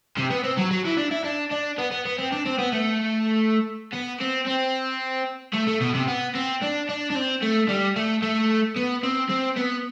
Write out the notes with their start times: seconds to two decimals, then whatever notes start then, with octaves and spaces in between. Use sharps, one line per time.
0.17 C3
0.31 B3
0.44 C4
0.57 F#3
0.71 F#3
0.85 E3
0.97 D4
1.11 E4
1.24 D4
1.51 D4
1.78 B3
1.91 B3
2.05 B3
2.18 C4
2.32 D4
2.46 C4
2.59 B3
2.72 A3
3.93 B3
4.20 C4
4.47 C4
5.54 A3
5.68 A3
5.81 B2
5.95 C3
6.08 B3
6.35 C4
6.62 D4
6.89 D4
7.10 D4
7.15 C4
7.42 A3
7.69 G3
7.96 A3
8.22 A3
8.76 B3
9.03 C4
9.30 C4
9.57 B3